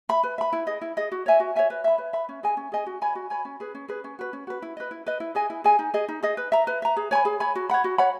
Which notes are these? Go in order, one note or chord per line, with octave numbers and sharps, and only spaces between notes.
E5 B5
B4
E5 B5
E4
G#4 D#5
E4
G#4 D#5
F#4
C#5 E5 G#5
F#4
C#5 E5 G#5
B4
E5 B5
B4
E5 B5
C#4
G#4 D#5 G#5
C#4
G#4 D#5 G#5
F#4
C#5 G#5 B5
F#4
C#5 G#5 B5
C#4
G#4 B4
C#4
G#4 B4
C#4
F#4 B4
C#4
F#4 B4
E4
B4 D#5
E4
B4 D#5
E4
G#4 D#5 G#5
E4
G#4 D#5 G#5
D#4
G#4 D#5
D#4
G#4 D#5
B4
E5 A#5
B4
E5 A#5
G#4
C#5 G#5 B5
G#4
C#5 G#5 B5
F#4
C#5 F#5 B5
F#4
C#5 F#5 B5